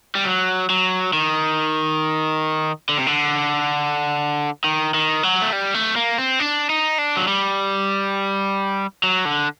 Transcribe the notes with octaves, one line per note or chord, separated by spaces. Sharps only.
G3
F#3
F#3
D#3
D3
C3
D3
D#3
D#3
F#3
A3
G3
A3
A#3
C4
D4
D#4
D4
F#3
G3
F#3
D3